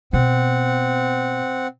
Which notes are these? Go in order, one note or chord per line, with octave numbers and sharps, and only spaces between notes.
B2 C4 F#5